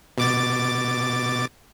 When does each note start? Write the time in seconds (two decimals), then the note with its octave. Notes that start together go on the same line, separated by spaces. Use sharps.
0.18 B2 D6 A6